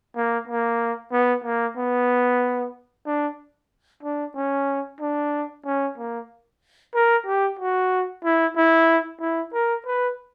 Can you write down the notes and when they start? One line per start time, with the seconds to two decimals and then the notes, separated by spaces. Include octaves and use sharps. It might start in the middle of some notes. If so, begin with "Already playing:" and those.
0.16 A#3
0.47 A#3
1.12 B3
1.44 A#3
1.77 B3
3.06 D4
4.03 D4
4.35 C#4
5.00 D4
5.65 C#4
5.98 A#3
6.94 A#4
7.26 G4
7.59 F#4
8.24 E4
8.56 E4
9.21 E4
9.53 A#4
9.86 B4